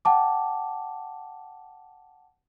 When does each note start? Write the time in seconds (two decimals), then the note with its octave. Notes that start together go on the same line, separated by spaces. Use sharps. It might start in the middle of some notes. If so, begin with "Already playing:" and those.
0.05 F#5 G5 A5 D6